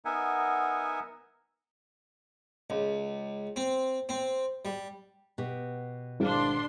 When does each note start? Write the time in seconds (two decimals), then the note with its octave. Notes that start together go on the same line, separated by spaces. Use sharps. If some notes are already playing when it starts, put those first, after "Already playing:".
0.05 B3 D#4 A#4 E5 F#5 G#5
2.70 C#2
3.56 C4
4.09 C4
4.65 G3
5.38 B2 G4
6.20 G#1 D4 F5 C6